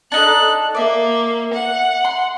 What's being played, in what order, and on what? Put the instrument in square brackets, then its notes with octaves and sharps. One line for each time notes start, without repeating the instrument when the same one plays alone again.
[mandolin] D4 D#4 A4 [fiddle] F#6
[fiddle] A#3 [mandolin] D5 E5
[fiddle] F#5
[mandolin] C6